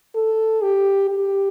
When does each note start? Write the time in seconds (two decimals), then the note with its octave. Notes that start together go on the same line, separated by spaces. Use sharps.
0.15 A4
0.62 G4
1.11 G4